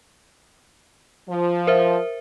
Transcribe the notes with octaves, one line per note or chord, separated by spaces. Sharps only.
F3
A#4 C5 E5